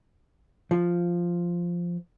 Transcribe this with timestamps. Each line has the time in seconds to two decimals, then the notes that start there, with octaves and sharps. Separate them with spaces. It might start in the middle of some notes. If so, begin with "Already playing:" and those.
0.71 F3